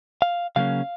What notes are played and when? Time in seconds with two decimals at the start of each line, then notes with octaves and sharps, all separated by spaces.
0.22 F5
0.56 C#3 F#3 A#3 C#4 F5